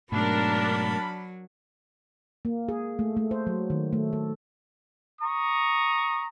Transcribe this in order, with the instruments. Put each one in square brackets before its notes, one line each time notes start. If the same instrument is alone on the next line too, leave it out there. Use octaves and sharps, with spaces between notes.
[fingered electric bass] G#2 B2 A3 [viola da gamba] F#3 [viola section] D4 A#4 [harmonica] A5 B5
[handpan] A#3
G#4
A3
A3
C5
F#3
D#3
A3
A4
[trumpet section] A#5 C#6 D#6